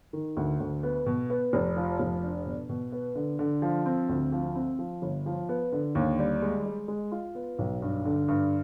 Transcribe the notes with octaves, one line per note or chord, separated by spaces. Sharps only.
D#3
D2
D2
B3
B2
B3
F1
F3
F1
D4
B2
B2
B3
D3
D3
F3
C4
D2
F3
C4
F3
G1
F3
B3
D3
D#2
G3
G#3
G#3
G#3
F4
B3
B1
G2
D3
G2